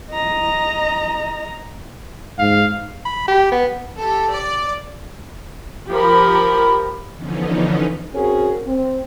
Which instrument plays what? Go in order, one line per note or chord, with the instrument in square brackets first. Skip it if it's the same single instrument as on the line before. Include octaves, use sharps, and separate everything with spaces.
[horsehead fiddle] D#5 A#5
[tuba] G#2 [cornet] F5
[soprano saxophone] B5
G4
B3
[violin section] G4 A4
D5
[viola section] F3 G4 A#4 B5
[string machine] D3 E3 F3 B3 C#4 D#4
[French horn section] C4 C#4 F#4 G#4 A#4
C4